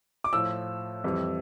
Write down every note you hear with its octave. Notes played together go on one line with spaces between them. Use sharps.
D6
A2 F3 E6
F2 E3 G3